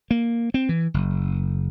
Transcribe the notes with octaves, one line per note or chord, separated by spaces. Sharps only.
A#3
C4
E3
F#1